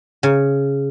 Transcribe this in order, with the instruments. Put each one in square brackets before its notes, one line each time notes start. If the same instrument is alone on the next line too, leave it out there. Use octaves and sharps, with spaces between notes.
[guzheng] C#3